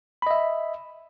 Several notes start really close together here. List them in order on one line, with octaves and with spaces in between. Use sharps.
B5 D#5 E5